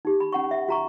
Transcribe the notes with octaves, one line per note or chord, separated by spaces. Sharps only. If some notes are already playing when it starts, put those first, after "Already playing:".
D#4 G4
B5
C#4 F#5 C#6
E5
F#4 A#5 C#6